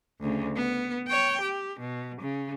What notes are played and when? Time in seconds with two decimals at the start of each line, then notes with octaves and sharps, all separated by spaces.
0.20 D2 C#3
0.56 B3
1.08 C#5 G5
1.41 G4
1.80 B2
2.21 C#3